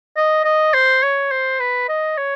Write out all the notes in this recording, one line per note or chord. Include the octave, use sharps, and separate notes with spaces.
D#5
D#5
C5
C#5
C5
B4
D#5
C#5